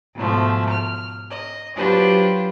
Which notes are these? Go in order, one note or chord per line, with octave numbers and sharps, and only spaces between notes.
G#2 B2 F3 A3
F6
D#5
F#3 D4 F4 G4 B4 C5